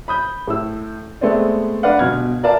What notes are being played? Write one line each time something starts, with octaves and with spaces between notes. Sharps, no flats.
B5 D#6 G6
A2 E6
G#3 A3 B3 C4 D5
D4 B4 D5 F5 F#5
G1 B2 F6 G#6
A#4 B4 D5 E5 F5 A5